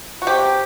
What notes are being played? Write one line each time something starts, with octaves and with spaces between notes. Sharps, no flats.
F#4
C3 G4